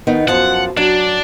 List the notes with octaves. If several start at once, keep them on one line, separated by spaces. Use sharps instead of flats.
D#3 B3 D#4
F#2 F3 F#5 A5
F#3 D4